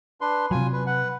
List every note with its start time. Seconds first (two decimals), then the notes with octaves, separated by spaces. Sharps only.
0.21 D4 B4 C6
0.51 C3 F#3 F4 G#5
0.73 B4
0.86 B4 F#5